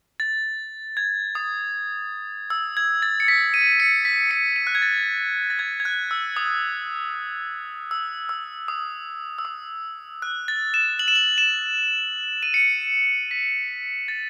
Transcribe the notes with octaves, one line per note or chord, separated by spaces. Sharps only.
A6
G#6
D#6
E6
G#6
A6
C#7
B6
D#7
C#7
B6
C#7
D#7
F#6
G#6
A6
A6
G#6
G#6
F#6
E6
D#6
E6
E6
D#6
E6
D#6
F#6
A6
E7
F#7
E7
F#7
E7
D#7
C#7
B6
A6